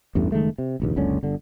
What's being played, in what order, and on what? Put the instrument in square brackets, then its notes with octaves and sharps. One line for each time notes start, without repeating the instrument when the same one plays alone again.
[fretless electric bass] A1 E2 G2 A3
F#1 D#3 G#3 A3
C3
F1 A#1 D#2
F#1 C#2 D3 C#4
G1 D3